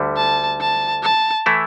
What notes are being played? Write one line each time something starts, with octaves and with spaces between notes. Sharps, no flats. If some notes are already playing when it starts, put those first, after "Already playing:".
Already playing: D2 D3 G3
A5
A5
A5
E3 A3 E4